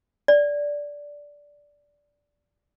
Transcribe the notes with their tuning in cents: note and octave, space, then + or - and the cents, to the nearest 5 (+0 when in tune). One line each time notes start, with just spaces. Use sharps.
D5 -10